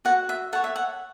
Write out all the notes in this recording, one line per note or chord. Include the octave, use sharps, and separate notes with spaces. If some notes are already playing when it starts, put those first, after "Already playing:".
F#4 F#5
E5
A4 C#5 F#5
E5
F#5